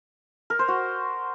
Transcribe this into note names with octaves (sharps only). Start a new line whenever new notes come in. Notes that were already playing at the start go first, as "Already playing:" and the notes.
A#4
C5
F#4